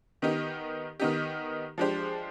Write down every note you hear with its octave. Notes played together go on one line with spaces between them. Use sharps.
D#3 B3 D#4 G4
D#3 B3 D#4 G4
F3 G#3 D4 G4 C5